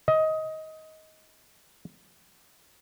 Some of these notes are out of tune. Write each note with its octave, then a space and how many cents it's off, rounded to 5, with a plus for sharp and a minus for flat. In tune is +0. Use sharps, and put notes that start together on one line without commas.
D#5 +20